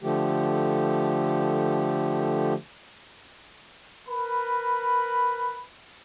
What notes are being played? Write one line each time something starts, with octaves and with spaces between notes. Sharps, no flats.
D3 F3 A3 G4
A#4 B4 B5